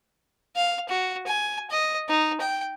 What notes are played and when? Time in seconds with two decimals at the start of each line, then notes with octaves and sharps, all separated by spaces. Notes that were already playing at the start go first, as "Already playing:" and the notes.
0.56 F5
0.89 F#4
1.27 G#5
1.70 D#5
2.09 D#4
2.41 G5